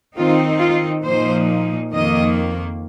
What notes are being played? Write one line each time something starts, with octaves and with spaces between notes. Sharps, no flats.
D#3 C4 D#4 F4
F4
A#2 F3 A#3 D#4 C5
F2 D#3 A#3 D#5